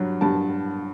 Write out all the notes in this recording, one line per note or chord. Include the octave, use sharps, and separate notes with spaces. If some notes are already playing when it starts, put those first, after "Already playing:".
Already playing: G2 F#3
G2 A5